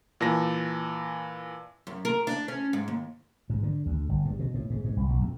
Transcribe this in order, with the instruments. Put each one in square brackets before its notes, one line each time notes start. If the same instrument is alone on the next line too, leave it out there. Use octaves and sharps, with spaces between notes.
[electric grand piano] A#2 E3 A5 A#6
[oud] F#2
A#4
D4
C#4
G#2
D#2
[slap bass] G#2
D3
D2
G1
G2
B2
A2
G#2
G#2
C2
B1
F2